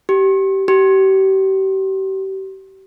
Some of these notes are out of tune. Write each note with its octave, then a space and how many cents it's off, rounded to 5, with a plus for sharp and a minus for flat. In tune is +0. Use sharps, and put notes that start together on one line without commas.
G4 -20
G4 -35